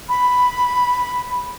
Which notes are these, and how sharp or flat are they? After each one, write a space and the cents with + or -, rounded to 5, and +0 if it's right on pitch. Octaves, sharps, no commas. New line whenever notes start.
B5 +0